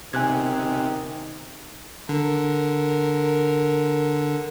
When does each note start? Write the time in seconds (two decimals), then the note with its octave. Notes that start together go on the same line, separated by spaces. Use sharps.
0.13 C3 D#3 G#5 F#6 G#6
2.09 D3 A#4